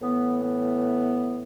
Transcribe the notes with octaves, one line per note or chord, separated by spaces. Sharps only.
A2 E3 B3
B3